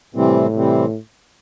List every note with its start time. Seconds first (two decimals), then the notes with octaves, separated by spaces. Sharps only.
0.14 A2 C3 E3 G3 C4
0.54 C3 E3 G3 C4